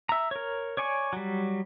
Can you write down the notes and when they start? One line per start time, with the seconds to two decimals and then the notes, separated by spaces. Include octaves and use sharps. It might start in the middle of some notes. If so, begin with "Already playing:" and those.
0.09 E5 A#5
0.31 A#4 C#5
0.77 C#5 D5 G#5 C#6
1.13 F#3 G3